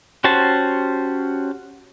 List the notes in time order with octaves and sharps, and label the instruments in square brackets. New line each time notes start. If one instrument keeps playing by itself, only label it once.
[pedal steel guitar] C#4 F#4 G4 C5 A5